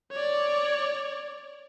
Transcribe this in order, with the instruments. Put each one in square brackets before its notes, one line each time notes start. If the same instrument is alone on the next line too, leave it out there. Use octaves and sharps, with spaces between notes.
[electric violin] C#5 D5